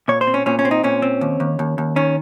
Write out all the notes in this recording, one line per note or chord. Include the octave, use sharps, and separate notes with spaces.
A#2 C#5
C5
C4
C#4
A#2 C#4
C#4
C4
D#4
A#2 C#4
C4
D#2
D#2
D#2
D#2
D#3 C#4